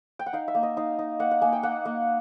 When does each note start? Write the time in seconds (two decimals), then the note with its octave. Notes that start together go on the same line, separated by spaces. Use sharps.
0.19 G5
0.26 F#5
0.33 D#4 F5
0.48 E5
0.55 A#3
0.63 D#5
0.77 D#4 F5
0.99 D#4
1.20 A#3 F#5
1.31 F#5
1.42 A#3 G#5
1.53 G5
1.63 A#3 F#5
1.85 A#3